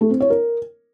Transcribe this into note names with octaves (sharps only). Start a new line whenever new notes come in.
A3
C4
C#5
A#4